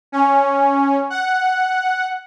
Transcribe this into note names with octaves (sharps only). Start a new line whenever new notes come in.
C#4
F#5